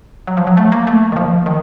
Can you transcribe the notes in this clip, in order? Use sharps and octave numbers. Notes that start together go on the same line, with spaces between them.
F#3
F3
F#3
A3
A#3
A3
D#3
F3
D#3